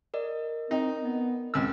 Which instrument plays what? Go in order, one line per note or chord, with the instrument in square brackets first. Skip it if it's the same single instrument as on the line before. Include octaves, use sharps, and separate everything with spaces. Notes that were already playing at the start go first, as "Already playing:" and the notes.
[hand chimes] A#4 D5 D#5
[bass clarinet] C4 [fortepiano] D#4
[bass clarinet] B3
[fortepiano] C#2 E6 [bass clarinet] C4